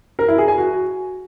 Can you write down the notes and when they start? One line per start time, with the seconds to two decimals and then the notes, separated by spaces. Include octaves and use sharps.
0.19 A#4
0.28 E4
0.38 G#4
0.48 G#5
0.58 F#4